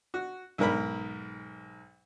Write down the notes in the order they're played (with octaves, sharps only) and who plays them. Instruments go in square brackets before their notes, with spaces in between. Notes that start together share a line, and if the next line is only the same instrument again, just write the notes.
[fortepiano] F#4
B1 G#2 A#4 B5